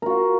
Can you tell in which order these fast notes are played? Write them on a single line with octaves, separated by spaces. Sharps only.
A#4 F#4 F4